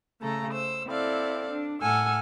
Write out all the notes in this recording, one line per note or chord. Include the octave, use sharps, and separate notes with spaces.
C#3 A3 A4 A#5
C5 E6
C4 E4 A4 D5 F5
D4
A2 A4 F#5 G#5 E6 F6